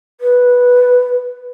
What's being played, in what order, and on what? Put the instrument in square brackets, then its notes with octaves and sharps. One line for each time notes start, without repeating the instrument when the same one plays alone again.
[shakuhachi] B4